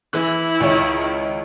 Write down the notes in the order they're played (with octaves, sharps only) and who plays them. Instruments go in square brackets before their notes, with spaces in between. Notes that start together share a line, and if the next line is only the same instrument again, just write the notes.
[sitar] E3 [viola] E4 [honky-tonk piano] F#6
[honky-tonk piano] C#2 C#5 [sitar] D#3